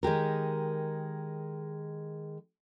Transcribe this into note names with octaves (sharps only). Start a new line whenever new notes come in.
D#3 G#3 G4 A#4